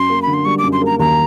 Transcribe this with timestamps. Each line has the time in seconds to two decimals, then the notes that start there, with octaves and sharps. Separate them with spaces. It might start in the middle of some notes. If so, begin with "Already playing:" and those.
Already playing: F#2 C6
0.10 A#3
0.22 D3 B5
0.34 C6
0.45 G3 C#6
0.58 D6
0.64 F#2
0.73 C6
0.82 A#3 A#5
0.99 D#2 A#5